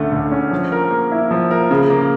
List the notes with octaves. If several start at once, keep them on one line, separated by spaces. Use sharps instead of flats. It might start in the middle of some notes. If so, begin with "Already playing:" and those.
Already playing: D2 D3 A3 C#4
D2
C#4
F3
A#4
A#3
E4
F3
A#4
C#3
A#3